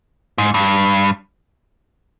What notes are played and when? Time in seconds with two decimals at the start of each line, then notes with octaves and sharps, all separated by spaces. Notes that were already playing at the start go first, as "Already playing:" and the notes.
0.38 G#2
0.54 G2